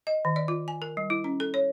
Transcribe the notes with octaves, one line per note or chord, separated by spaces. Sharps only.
D#5
D#3
D5
F4
G#5
A#4
G3
E4
C#4
A4
C#5